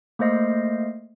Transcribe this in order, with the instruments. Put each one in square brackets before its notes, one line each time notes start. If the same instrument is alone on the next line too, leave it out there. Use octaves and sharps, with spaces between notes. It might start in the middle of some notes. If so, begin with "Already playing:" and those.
[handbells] A3 A#3 C5 D#5 F5